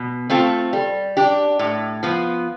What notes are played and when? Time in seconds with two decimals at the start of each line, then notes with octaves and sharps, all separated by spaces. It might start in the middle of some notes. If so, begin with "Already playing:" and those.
Already playing: B2
0.30 A3 C4 F4 A4
0.73 G3
1.17 D4 G4
1.59 A2
2.03 F3 B3